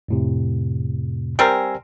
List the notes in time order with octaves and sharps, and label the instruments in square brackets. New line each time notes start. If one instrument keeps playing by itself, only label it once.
[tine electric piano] F2 A2 C3
[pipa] G3 C4 A#4 [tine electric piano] G#5 E6 C7